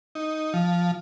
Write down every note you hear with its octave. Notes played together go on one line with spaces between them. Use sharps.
D#4
F3